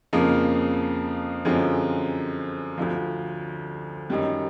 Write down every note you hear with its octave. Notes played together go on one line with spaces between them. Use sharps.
F2 C#3 F3 A#3
F#2 D3 F3 G#3 C4
D2 D3 F3
F#2 D#3 G3